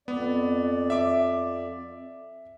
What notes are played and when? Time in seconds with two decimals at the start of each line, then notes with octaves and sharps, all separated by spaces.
0.08 F2 B3 D5
0.90 E5 D6